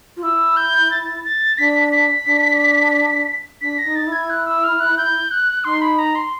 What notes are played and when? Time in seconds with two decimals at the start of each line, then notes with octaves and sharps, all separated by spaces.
0.16 F4
0.23 E4 E6
0.57 G6
0.91 A6
1.25 A6
1.58 D4 B6
1.92 B6
2.26 D4
3.61 D4 B6
3.79 A#6
3.84 D#4
3.96 A6
4.01 D#4
4.07 E4
4.12 G#6
4.30 F#6
4.46 E6
4.64 F6
4.80 F#6
4.98 G6
5.31 F#6
5.64 D#4 C6
5.82 B5
5.99 A#5
6.15 C6